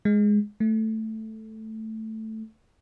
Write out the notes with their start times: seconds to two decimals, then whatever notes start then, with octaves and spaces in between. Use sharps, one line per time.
0.05 G#3
0.60 A3